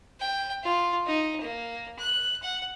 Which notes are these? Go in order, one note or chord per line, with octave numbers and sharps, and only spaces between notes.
G5
F4
D#4
A#3
F#6
F#5